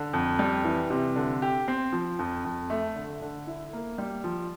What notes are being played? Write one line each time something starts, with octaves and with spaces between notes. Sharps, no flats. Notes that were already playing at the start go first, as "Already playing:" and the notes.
Already playing: D3
F2
G3
E3
C3
D3
G4
C4
F3
F2
F2
A3
D3
D3
E4
A#3
G3
F3